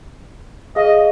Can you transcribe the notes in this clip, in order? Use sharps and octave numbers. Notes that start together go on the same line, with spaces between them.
G#4 D#5 F5